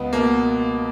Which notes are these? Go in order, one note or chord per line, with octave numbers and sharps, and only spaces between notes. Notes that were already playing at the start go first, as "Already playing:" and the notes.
Already playing: C#2 B3
B2 A#3